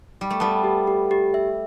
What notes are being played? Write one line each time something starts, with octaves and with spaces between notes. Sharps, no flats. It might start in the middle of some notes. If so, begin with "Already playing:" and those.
G3
A3
G3 B3 A5
G4
G4
G4
E5